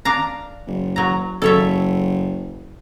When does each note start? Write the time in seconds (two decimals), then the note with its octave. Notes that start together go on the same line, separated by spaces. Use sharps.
0.05 D4 F5 A#5
0.67 F#1
0.96 F#3 A#5
1.42 F#1 A4 C#5 E5